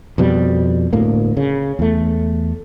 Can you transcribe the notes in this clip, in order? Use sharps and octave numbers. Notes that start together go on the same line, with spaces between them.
F2 B2 G3
G1 D2 A2 A#3
C#3
E2 A3